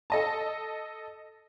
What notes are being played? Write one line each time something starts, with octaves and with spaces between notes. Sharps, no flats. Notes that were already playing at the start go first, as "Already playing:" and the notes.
A4 D#5 A5